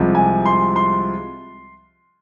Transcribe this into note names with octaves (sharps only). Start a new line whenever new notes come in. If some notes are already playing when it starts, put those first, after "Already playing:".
Already playing: C2 C3 F3 G#3
G#5
C6
C6